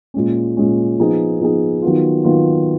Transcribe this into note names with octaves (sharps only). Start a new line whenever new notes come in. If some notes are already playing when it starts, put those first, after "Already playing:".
A#2 G#3 C#4
A#2 G#3 C#4
F3 B3 D#4 G#4
F3 B3 D#4 G#4
D#3 F#3 B3 F4
D#3 F#3 B3 F4